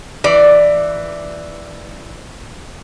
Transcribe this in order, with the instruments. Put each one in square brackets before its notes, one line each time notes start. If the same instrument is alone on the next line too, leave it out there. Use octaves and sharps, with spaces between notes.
[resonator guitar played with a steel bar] E3 D5